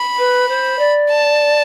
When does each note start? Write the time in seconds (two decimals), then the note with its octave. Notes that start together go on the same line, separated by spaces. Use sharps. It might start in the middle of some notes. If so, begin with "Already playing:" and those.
Already playing: B5
0.18 B4
0.48 C5
0.79 D5
1.10 A5